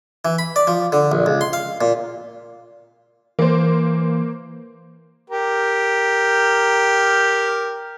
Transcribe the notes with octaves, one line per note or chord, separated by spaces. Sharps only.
E3
B5
D5
F3
D3
A#1
C#2
C6
F5
A#2
E3 A#3 C5
G4 A#4